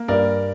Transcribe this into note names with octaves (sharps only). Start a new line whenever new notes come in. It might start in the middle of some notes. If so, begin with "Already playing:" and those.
Already playing: A#3
G2 A#4 D5